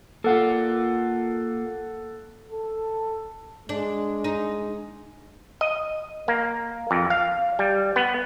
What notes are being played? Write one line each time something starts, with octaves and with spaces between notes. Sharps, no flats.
A#3 F4 A4 F#5
A4
G#3 D4
D#4
D#5
A#3
F2
F5
G3
B3